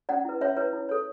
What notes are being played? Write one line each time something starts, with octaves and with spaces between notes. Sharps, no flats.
C#4 D5 F#5
E4 B4
C#4 C#5 E5
E4 B4 C#5
E4
A4 C#5